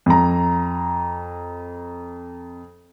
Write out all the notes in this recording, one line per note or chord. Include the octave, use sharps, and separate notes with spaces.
F2 A#5